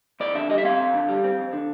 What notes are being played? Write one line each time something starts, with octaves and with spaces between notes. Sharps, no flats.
F2 D5
D3 E5
G3 D#5
E5
C4 F5
F2
D3
G3
C4
F2
D3